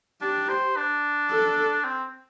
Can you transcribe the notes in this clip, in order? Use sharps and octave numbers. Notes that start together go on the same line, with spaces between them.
D4 G4
C5
D4
A4
C4